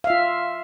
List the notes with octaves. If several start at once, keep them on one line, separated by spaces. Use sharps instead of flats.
F4 E5 F5